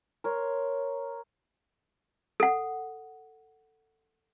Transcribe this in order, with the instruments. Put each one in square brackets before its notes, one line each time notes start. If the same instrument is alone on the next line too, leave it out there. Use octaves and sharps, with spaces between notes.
[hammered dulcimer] A#4 C#5 C6
[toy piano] A4 F#5